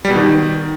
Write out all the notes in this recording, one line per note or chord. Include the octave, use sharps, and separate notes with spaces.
G3
B2
D#3